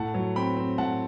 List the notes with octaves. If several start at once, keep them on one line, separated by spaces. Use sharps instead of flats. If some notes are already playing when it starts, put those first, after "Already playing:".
Already playing: A2 F#5 A5
F#3
C4 G5 B5
C4
A2 F#5 A5